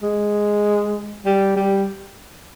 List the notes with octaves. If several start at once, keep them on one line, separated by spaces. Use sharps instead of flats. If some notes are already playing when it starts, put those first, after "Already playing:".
G#3
G3
G3